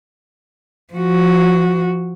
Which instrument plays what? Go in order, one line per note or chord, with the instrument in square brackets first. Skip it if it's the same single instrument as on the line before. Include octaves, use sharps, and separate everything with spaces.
[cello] F3 F#4